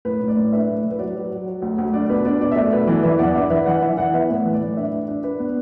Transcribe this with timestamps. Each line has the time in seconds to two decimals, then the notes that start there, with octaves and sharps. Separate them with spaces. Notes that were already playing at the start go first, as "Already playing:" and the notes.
0.05 A2 B4
0.21 A2
0.28 D5
0.36 A2
0.52 D4 B4 E5
0.69 A2
0.83 A2
0.91 B4
0.99 F#3 D5
1.15 F#3
1.30 F#3
1.47 F#3
1.62 D2
1.78 D2
1.93 D4 D5
2.05 D5
2.09 B2 B4
2.25 D4 D5
2.41 B2 D5
2.51 E5
2.56 A3 D5
2.72 B2 B4
2.87 E3 D5
3.03 E3 B4 E5
3.19 E2 D5 F#5
3.35 D4 B4 E5
3.50 E3 B4 E5
3.66 E3 D5 F#5
3.82 E3 B4 E5
3.97 E3 D5 F#5
4.14 B3 B4 E5
4.30 A2 B4
4.45 E3
4.53 D5
4.61 A2
4.76 D4 B4 E5
4.92 D4
5.08 D4
5.23 D4 B4
5.40 B3